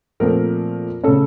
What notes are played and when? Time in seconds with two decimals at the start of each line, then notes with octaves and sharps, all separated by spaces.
0.20 A#2 F3 A3 C4 A#4
1.04 C#3 A3 C#4 A4